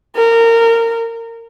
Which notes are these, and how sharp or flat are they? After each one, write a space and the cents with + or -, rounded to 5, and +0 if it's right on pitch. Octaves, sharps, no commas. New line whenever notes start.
A#4 -20